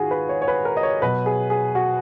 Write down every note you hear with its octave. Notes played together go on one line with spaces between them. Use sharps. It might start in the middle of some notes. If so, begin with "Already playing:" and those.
Already playing: G#2 D#3 G#3 F4 F#4 G#4
B4
C#5
C#5
B4
A#4
D#5
C#5
B2 F#3 B4
G#4
G#4
F#4